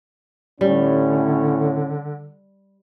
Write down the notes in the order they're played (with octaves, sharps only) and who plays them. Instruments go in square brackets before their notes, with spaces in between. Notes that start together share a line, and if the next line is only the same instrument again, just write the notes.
[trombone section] A2 C#4 [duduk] D3 [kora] G3